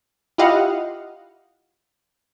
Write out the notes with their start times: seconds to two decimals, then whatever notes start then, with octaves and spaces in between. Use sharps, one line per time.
0.38 E4 F4 G4 D#5 F5 F#5